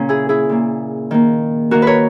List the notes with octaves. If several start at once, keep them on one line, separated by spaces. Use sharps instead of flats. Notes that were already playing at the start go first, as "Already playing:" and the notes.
Already playing: A#2 C#3 A#3 C#4
E4 G#4
E4 G#4
A#2 A#3
D#3 A#3
D#3 A#3 F#4 A#4
A#4 B4 C#5